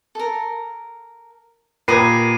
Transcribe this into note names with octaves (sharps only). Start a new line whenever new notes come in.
A4 A#4
A#2 G4 A#4 B4 D#6 G#6 C7 D#7